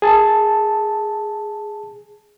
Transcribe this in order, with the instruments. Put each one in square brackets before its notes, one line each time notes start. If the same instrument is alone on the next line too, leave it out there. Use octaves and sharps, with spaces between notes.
[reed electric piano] G#4 A5